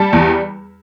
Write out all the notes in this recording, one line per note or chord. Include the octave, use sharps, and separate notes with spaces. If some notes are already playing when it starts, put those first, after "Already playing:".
Already playing: G3 A5
E2